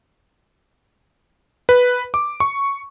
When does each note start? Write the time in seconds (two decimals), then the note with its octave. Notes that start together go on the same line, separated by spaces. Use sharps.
1.69 B4
2.14 D6
2.40 C#6